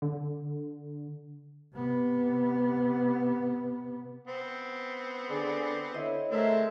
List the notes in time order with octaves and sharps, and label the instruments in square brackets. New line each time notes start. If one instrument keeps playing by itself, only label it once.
[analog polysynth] D3
[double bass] C3 B3
[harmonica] B3 C4
[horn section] D3 G#4 D5
[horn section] D3 E4 [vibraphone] C#5 D#5
[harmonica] G#3 C4 [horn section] A3 A#4 E5